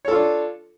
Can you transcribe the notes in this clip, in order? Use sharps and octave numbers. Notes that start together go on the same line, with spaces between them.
D4 F4 A4 C#5